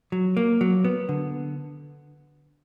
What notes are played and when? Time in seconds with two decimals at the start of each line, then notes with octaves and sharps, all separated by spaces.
0.12 F#3
0.37 A#3
0.61 F#3
0.85 B3
1.09 D3